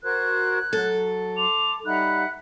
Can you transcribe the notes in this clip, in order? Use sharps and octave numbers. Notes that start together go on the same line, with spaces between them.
F#4 A#4 C5 F#6 G#6
F#3 A4
C6 D6 F7
G3 D#4 E5 F#5 B5 F#6